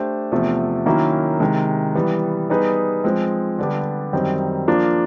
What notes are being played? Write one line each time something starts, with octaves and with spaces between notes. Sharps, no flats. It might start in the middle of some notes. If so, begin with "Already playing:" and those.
Already playing: A3 D4 G4 C5
E2 C3 F3 A3
D#3 F#3 A#3 C#4 E4
C3 D#3 G#3
E3 G3 B3
G3 B3 D#4 G#4 B4
F3 G#3 C4
D3 G3 B3 D4 G4
F#2 D#3 G3 C4 D#4
F3 A#3 D4 F4